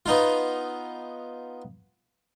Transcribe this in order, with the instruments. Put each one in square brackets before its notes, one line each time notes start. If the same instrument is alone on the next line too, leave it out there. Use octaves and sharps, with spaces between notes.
[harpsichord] B3 D#4 F4